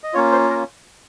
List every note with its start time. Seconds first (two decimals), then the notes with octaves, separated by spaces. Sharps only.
0.04 D#5
0.14 A#3 C#4 F4 C#5
0.32 C5
0.49 A#4